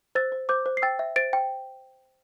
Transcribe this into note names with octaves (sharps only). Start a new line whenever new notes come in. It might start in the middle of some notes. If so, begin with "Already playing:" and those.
C5 E6 A6
C5
C5 D6 G6
C5
C7
G5 E6 A6
E5
C5 A6 D7
G5